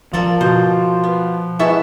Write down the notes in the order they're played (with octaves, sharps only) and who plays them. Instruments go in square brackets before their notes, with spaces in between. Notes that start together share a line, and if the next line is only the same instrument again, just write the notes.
[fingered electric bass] F3 [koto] A#3 A4 D5 [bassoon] F4
[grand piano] B2 [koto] C5
[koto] B3
[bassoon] G#3 [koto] B3 A4 E5 [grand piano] E4 C#6